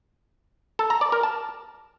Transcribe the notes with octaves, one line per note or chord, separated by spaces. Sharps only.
A4
A#5
D5
A#4
A5